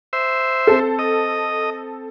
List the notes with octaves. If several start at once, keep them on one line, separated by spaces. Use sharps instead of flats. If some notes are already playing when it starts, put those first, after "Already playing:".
C5 E5
C4 A4
D#5